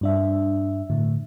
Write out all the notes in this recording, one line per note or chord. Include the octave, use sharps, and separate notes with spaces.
G2 D4 E5
A2 D3